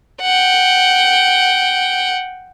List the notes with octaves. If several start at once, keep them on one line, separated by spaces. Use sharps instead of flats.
F#5 G5